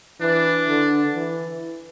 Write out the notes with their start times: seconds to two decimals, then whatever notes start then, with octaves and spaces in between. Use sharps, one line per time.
0.21 E3 D4
0.68 D3
1.15 E3